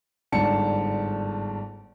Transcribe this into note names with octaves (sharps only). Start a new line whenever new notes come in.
G1 G#2 D4 A5 C#7